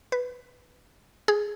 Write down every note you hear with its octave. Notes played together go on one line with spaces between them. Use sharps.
B4
G#4